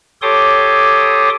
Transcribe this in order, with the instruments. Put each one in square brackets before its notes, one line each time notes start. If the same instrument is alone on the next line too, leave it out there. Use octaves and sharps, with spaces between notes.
[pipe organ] G4 A4 C#5 C6 D6 D#6